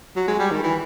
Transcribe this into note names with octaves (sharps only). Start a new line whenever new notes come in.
F#3
G#3
G3
D#3
E3